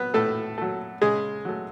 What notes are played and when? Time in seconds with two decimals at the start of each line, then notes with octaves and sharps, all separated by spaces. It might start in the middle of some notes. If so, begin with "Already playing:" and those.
Already playing: F#3 B3 B4
0.14 A2 A3 A4
0.58 F#3 A3
1.02 C#3 G#3 G#4
1.45 F#3 A3